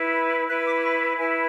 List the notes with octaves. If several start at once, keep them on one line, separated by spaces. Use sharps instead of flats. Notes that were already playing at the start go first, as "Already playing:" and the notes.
Already playing: E4 B4
E4 B4 F#6
D6
C#6
B5
E4 B4 G#5